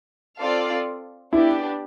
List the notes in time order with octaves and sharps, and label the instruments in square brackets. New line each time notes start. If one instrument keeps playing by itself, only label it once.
[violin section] C4 F4 A4 D5 F5
[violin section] B3 D4 G4 [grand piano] E4